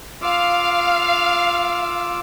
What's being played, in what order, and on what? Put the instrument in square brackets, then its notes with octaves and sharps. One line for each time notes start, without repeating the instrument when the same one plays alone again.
[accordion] F4 D6 E6 [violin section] F5